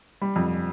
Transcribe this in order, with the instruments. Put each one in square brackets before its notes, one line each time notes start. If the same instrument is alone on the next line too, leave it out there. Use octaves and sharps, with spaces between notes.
[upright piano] G3
F2